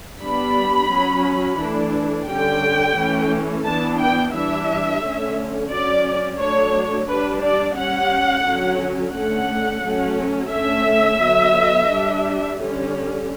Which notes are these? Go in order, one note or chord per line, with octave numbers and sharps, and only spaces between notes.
G3 B3 D4 B5
F#3 C#4
E3 A3 D4
D3 G3 C#4 G5
E3 A3 C#4
E3 B3 D4 A5
G5
E3 G3 D4 E5
D3 A3 C#4
F#3 C#4 D5
F#3 A3 D4 C#5
G3 D4 B4
D5
G3 C#4 F#5
D3 F#3 C#4
D3 A3 C#4 F#5
F#3 A3 C#4
D3 A3 C#4 E5
D3 F#3 B3
G3 D4
D3 G3 C#4